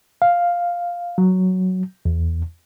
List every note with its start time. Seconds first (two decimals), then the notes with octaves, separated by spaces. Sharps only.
0.22 F5
1.18 F#3
2.05 E2